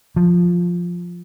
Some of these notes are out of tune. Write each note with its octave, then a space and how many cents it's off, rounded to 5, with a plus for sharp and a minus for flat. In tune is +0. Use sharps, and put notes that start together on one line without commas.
F3 +5